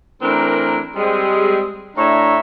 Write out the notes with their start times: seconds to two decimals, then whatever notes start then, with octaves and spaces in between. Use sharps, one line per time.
0.22 E3 A3 C4 D4 A#4
0.96 G3 G#3 C4
1.97 A2 D4 C#5 E5 A#5